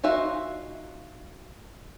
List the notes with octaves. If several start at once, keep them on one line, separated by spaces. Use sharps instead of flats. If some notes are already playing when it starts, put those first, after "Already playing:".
D#4 F4 F#4 E5